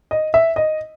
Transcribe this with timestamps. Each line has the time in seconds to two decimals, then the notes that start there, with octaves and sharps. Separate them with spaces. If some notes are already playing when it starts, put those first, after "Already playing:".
0.11 D#5
0.34 E5
0.56 D#5